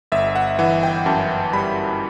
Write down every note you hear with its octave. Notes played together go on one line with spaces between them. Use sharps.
G1 E5
F#5
E3 F#5
G5
F#2 A5
G3 B5